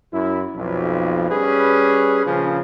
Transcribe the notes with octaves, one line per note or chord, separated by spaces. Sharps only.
F#2 E4
B1 F2
G3 C#4 G#4 B4
A#1 C#3 F3 C#4